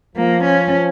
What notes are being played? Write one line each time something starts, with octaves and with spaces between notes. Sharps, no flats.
F3 A#3
C#4